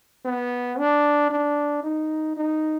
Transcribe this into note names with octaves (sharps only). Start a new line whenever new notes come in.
B3
D4
D4
D#4
D#4